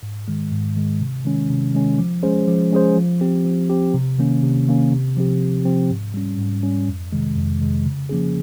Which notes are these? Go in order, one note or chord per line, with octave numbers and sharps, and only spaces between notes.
G#2
D#3 G#3
G#2
D#3 G#3
C3
D#3 G#3 C#4
C3
D#3 G#3 C#4
F3
G#3 C#4 G#4 C5
F3
G#3 C#4 G#4 C5
F3
C4 G4
F3
C4 G4
C3
D#3 A#3 C#4
C3
D#3 A#3 C#4
C3
F3 C4 G4
C3
F3 C4 G4
G#2
G3 C#4
G#2
G3 C#4
F2
C3 D#3 G#3
F2
C3 D#3 G#3
C#3
F3 A#3 C#4 G#4